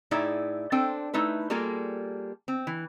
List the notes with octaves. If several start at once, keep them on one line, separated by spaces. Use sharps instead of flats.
A2 D#4 E4 G#4 D5 E5
C4 D4 A4 C5 G5
A3 D#4 E4 B4
G3 A#3 F4 G#4 A4
C4
E3